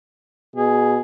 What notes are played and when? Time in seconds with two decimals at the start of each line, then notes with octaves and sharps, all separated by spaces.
0.56 B2 G#4